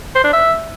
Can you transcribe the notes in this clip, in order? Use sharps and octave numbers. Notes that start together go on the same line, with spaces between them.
C5
D4
E5